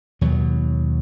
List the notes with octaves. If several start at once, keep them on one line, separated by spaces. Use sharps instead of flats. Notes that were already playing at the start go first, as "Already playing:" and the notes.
D#2 B2 F#3